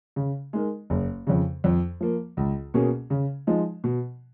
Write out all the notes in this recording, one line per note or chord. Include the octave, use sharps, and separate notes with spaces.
C#3
G#3 D#4 A#4
F#1
F2 C#3
F2
F3 A#3
C#2
B2 A#3 C#4 G#4
C#3
F3 G#3 D#4
B2